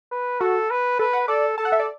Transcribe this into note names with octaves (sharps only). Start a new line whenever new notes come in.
B4
F#4 A4
B4
A4 B4
F#5
A4 D5
A4 A5
F#5
E5
D5